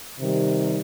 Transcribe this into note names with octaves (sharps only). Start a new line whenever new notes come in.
C3 D#3 G3